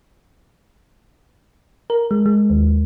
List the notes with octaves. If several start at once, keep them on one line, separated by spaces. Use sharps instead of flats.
A#4
G#3
G#3
D#2